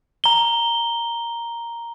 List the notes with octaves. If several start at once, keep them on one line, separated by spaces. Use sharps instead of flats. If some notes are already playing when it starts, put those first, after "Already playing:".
A#5 G7